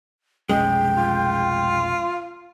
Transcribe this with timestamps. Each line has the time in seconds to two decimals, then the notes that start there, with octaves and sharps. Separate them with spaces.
0.49 F1 B1 G#3 C#4 G5
0.97 F4